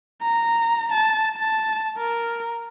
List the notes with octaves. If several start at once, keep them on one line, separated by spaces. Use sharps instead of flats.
A#5
A5
A5
A#4